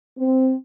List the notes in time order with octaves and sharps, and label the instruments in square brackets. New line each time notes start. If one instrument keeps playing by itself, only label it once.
[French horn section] C4